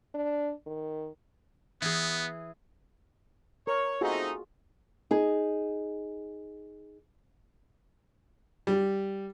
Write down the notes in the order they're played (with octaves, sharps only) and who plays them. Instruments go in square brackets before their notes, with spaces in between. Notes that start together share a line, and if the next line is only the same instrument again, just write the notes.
[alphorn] D4
D#3
[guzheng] E3 G#4 [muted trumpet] B3
[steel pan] A#4 [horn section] C#5
[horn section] A3 C4 D#4 [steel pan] F4 F#4 G#4
[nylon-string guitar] D#4 G#4
[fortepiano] G3